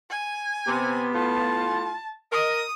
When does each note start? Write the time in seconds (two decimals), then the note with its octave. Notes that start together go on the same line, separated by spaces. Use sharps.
0.11 G#5
0.67 C3 B3
1.15 A2 F4 A5
2.32 A#4 D#5 D#6